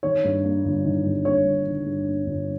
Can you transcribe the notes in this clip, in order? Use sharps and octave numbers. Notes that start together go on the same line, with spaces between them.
D#3 C#5
G2
A#3
G1
D#3
G2
A#3 C#5
G1
D#3
G2
A#3
G1